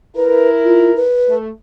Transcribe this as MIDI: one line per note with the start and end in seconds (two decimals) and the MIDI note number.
0.16 1.04 64
0.16 1.04 70
0.16 0.49 71
0.65 0.96 65
0.96 1.36 71
1.28 1.49 57